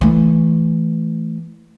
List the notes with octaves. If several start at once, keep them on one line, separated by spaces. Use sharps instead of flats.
E3 A3